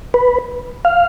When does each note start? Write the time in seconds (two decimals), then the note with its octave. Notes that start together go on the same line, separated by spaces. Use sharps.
0.14 B4
0.85 F5